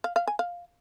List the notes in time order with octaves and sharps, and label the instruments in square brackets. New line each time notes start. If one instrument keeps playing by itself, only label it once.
[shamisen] F5
F5
G#5
F5